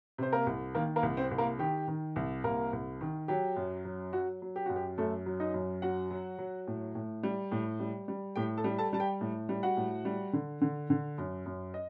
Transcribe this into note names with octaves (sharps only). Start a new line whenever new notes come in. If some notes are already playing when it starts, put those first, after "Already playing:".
C3 C5
A#3 A#4
C2
D#3 A#3 A#4
A#3 A#4
C2
C4 C5
C2
A#3 A#4
D#3 G4
D#3
C2
C2 A#3 A#4
C2
D#3
F#3 G4
F#2
F#3
F#3 F#4
F#3
G4
F#2 F#4
G4
F#2 A3 A4
F#3
D#4 D#5
F#2
F#3 F#4 F#5
F#3
F#3
A2
A2
G3
A2
G3
G3
A2 G4 G5
A4 A5
G3
A4 A5
G3 A5
G4 G5
A2
G3
F#4 F#5
A2
G3
D3
D3
D3
F#2
F#2
D#5